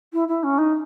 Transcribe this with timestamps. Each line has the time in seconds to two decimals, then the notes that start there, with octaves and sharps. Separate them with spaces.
0.13 E4
0.28 E4
0.43 C#4
0.58 D#4